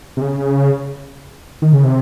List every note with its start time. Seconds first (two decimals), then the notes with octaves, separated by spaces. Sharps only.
0.17 C3
0.22 C#3
1.62 D#3
1.73 C#3
1.84 C3